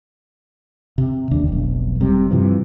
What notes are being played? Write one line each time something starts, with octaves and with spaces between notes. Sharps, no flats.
C3
D1 D#2 D4
F1 B1
E1 C3 G3
G2 C3 E3 F3